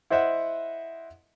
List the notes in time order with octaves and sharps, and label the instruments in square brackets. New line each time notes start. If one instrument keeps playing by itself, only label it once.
[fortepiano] E4 C5 D#5 E5 F#5